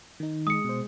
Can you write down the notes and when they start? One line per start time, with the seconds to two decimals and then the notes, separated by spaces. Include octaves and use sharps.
0.20 D#3 D#4
0.47 G#3 D#6 C#7
0.65 B2 C5